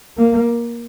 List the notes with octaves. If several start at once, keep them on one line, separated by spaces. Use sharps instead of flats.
A#3